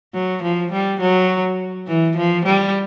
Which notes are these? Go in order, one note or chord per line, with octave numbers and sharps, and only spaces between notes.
F#3
F3
G3
F#3
E3
F3
G3